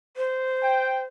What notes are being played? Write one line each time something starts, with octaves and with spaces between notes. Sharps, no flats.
C5
G5